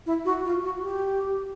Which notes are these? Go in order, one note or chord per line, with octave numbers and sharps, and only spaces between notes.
E4
F#4
F4
F#4
G4